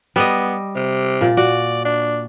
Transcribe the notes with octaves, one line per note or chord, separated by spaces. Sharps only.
G3 B3 D#5
C3
A#2 D5
F#4 D5
D4